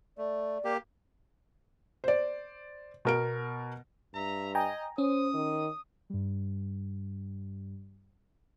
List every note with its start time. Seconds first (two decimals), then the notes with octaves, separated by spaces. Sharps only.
0.18 A3 D5
0.64 A#3 G4
2.04 C5 D5
3.05 B2 A#4 D7
4.15 G2 E5 A#5
4.55 D#5 G5 G#5 A#5
4.98 C#4 C5 D#6
5.34 D#3
6.10 G2 G3